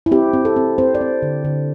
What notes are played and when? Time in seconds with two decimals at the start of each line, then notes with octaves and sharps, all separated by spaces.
0.06 E4
0.11 C4 G4
0.33 C4
0.45 A4
0.56 C4
0.78 C4 C5
0.95 D5
1.01 C4
1.22 D3
1.45 D3